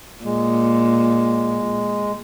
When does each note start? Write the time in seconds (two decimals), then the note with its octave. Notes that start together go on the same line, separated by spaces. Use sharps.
0.24 A#2 G#3